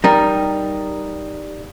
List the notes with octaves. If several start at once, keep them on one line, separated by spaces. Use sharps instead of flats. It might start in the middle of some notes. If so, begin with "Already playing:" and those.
G3 D#4 A#4